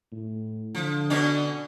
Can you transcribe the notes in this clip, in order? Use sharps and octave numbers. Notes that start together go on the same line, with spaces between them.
A2
D3 F3
B2 C#4 D4